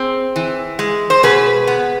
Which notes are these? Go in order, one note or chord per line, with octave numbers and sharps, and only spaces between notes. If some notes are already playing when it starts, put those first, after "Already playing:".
Already playing: C4 G#4
E3
G#3
C5
B2 G#4 B4
B3